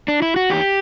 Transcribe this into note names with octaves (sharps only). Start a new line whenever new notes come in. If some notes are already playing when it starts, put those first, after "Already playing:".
D4
E4
F#4
E2 G4